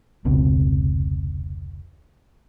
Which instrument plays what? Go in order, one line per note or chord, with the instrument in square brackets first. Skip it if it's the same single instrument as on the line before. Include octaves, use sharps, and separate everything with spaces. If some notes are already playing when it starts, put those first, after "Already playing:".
[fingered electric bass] F1 C#2 B2 C4